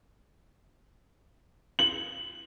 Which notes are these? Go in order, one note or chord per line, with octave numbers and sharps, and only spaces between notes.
F#7